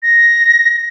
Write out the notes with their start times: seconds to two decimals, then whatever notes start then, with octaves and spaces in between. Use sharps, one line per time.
0.03 A#6